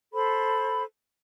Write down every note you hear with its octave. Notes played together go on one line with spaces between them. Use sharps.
A4 C5 B5